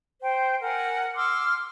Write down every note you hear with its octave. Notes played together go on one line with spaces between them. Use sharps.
C5 G5
A#4 F#5 G#5
C6 D6 E6 F6